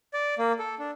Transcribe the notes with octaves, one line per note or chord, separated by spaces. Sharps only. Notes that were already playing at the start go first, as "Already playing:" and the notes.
D5
A#3
A4
D4